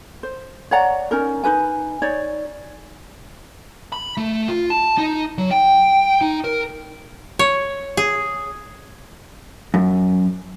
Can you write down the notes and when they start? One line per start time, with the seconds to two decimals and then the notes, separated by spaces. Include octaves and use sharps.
0.23 C5
0.71 C#5 D5 F#5 A#5
1.11 C#4 D#4 A#4
1.44 D#4 F#4 B4 G#5
2.02 D#4 C#5 D5
3.92 B5
4.17 A3
4.48 F4
4.70 A5
4.98 D#4
5.38 F#3
5.51 G5
6.21 D#4
6.44 A#4
7.39 C#5
7.97 G#4
9.74 F#2